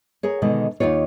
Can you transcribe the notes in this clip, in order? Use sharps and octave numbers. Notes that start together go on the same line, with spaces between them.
G#4 A#4 C#5
B2 D3 D#3 G#3
D#2 G#2 D#4 F4 C#5